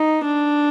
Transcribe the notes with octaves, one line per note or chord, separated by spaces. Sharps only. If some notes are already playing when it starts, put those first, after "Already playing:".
Already playing: D#4
D4